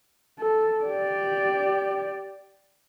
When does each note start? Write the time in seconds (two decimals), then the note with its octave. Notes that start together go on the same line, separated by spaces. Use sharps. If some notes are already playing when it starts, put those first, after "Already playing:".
0.39 A4
0.84 G4 D5